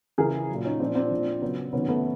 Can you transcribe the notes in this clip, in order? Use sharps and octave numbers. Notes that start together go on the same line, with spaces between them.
C#3 E3 G#4 A#4
F#3
A#2
C#4 D#4
A#2 F3 C4 D4
C4 D4
A#2 F3
C#3 F#3 B3 C#4
C3 D#3 F#3 B3 C#4
A3 B3